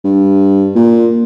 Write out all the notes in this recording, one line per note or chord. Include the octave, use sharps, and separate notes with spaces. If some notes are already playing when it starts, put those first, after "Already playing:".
G2
A#2